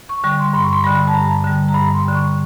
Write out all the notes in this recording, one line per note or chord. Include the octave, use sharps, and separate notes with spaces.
C#6
D3 G3 C#6
C6
G2 C6
C#6
C6
D3 G3 B5
A5
G2 A#5
D3 G3
A#5
G2 B5
C6
D3 G3
C#6